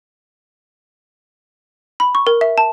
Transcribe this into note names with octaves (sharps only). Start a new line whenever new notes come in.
B5
C#6
A#4
E5
A5